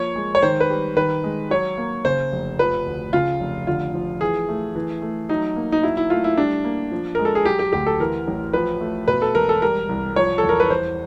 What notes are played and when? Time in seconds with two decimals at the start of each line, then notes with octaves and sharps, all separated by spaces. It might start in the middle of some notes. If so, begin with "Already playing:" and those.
Already playing: F3 A#3 C#5
0.16 G#3
0.35 C#5
0.42 D#3 C5
0.60 B4
0.70 G3
0.96 D#3 B4
1.24 G#3
1.51 F#3 C#5
1.78 A#3
2.05 C#3 C5
2.32 F1
2.59 F3 B4
2.86 D2
3.13 C#3 F4
3.40 F1
3.67 D3 F4
3.94 F3
4.21 E3 G#4
4.49 A3
4.75 E3
5.02 A3
5.29 F#3 D#4
5.56 A#3
5.72 D#4
5.83 F#3 E4
5.97 E4
6.10 A3 F4
6.24 E4
6.37 G3 D4
6.64 A#3
6.92 F3
7.15 G#3 A#4
7.25 A4
7.35 G#4
7.45 F#3 G4
7.59 G4
7.73 D2 G4
7.86 A4
8.00 E3 A#4
8.28 A1
8.53 F3 B4
8.81 A3
9.08 B2 B4
9.22 A4
9.35 E1 A#4
9.49 A4
9.62 G3 A#4
9.89 C2
10.16 F3 C#5
10.38 A4
10.43 E2
10.49 A#4
10.60 B4
10.70 E3 C5